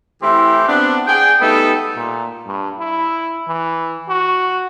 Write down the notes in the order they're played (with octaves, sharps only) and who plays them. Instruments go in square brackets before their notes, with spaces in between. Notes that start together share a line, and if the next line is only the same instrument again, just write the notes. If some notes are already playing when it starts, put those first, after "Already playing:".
[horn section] E3 A3 C4 E4 G4
B3 C4 D4
G#4 G5
G3 A3 B3 D#4 A4
[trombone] A#2
G2
E4
E3
F#4